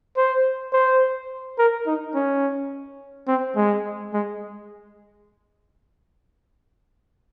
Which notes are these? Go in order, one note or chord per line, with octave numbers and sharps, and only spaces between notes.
C5
C5
A#4
D#4
C#4
C4
G#3
G#3